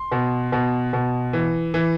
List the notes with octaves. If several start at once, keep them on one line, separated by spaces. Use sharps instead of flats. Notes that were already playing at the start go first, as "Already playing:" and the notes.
Already playing: C6
B2
B2
B2
E3
E3